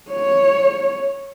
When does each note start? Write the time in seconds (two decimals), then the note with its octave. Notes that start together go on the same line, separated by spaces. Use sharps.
0.11 C#5